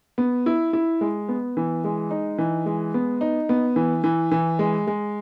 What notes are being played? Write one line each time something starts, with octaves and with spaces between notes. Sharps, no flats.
B3
E4
E4
G#3
B3
E3
G#3
D#4
E3
G#3
B3
D#4
B3
E3
E3
E3
G#3
G#3